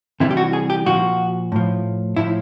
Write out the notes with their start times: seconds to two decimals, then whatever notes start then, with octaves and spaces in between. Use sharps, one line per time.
0.20 C3 E3 G3 E4
0.31 G4
0.37 F#4
0.53 G#4
0.70 G4
0.86 A#2 F3 F#4
1.52 A2 F3
2.17 A2 F3 E4